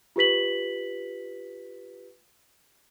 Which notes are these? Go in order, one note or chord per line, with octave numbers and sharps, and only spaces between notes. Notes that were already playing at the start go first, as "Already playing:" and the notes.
F4 G4 B4 B6 F#7